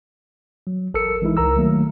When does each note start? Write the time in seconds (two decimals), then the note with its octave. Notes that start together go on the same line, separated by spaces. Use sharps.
0.67 F#3
0.94 A1 A4 A#4 E6 C#7
1.22 E3 G#3 D#4 E4
1.37 C#2 A#4 A#5 E6
1.56 D#3 F#3 A3 A#3